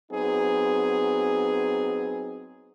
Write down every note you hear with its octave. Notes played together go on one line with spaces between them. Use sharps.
F#3 B3 C4 D#4 G#4